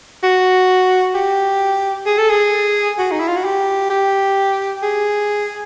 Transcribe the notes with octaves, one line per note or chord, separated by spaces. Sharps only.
F#4
G4
G#4
A4
G#4
F#4
D#4
E4
F4
F#4
G4
G4
G#4